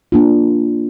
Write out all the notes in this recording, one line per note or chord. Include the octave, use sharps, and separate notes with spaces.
A#3 D4 F4